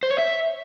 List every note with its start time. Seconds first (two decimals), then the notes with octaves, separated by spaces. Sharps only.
0.03 C5
0.11 C#5
0.18 E5